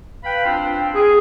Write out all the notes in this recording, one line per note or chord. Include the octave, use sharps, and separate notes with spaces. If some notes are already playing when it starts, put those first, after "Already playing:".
B4 F5 G5 B5
C4 D4 F4 C5 F5 G5
G#4